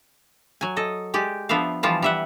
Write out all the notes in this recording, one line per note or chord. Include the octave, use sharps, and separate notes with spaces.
F#3 G#5
A4 D#5
G#3 G4 D5
F3 B3 D4 E5 F5
E3 F3 G3 F4 A5
G3 E5 F#5